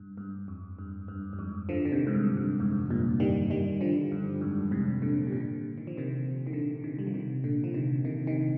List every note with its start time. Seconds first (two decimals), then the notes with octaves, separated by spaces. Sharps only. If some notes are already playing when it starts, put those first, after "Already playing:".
Already playing: G2
0.17 G2
0.48 F2
0.79 G2
1.08 G2
1.33 G2
1.39 F2 G#2
1.69 D3 F3
1.85 D3
1.92 C3 D#3
2.07 G#2
2.15 G2
2.37 G2
2.60 F2 G#2
2.90 G2 A#2
3.20 D#3 G3
3.50 D#3 G3
3.81 D3 F3
4.12 G2
4.41 F2 G#2
4.71 G#2 C3
5.02 A#2 D3
5.27 C3
5.32 A#2 D3
5.78 D#3
5.87 F3
5.97 C3 D#3
6.47 D#3
6.53 D3 F3
6.84 C3 D#3
6.99 G3
7.07 F3
7.14 C3 D#3
7.44 A#2 D3
7.64 F3
7.74 C3 D#3
8.05 C3 D#3
8.27 C3 D#3